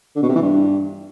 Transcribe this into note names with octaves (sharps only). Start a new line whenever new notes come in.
D3
B2
C3
E3
G2